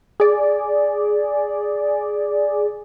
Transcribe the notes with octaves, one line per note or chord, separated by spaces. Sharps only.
G#4 D5